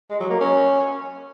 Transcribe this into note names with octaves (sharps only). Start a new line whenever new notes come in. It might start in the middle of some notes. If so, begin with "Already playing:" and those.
G#3
F#3
A#3
C#4